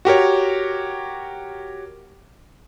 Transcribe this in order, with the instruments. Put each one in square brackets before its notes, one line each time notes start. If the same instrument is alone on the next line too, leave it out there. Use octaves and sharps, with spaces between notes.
[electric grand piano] F#4 G4 A#4 C#5